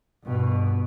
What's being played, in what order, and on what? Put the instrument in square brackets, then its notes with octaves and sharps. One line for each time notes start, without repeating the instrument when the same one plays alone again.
[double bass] G2 B2